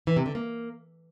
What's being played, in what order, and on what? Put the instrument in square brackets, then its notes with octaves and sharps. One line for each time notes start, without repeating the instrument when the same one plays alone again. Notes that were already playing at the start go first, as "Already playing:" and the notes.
[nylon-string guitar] E3
C3
D3
A#3